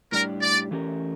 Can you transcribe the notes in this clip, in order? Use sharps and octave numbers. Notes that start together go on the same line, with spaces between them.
A2 G3 D4 G4 A#4
D5
E3 A3 C#4 G4 A#4